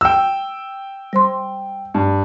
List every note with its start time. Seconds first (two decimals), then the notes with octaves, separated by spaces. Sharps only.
0.01 G5 E6
1.13 G3 C5 C6
1.94 G2